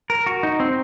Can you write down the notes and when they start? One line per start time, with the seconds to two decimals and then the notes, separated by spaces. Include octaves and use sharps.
0.10 A#4
0.26 F#4
0.43 D#4
0.60 C4